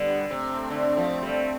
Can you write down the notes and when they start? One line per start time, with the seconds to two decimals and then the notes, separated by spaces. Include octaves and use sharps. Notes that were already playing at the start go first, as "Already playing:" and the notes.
Already playing: D3 G3 B3
0.29 C3 A3 C4
0.70 D3
0.97 F3
1.22 G3